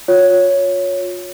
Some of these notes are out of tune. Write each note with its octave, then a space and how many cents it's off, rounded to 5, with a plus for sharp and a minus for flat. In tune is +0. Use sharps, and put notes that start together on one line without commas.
F4 +30 C#5 +5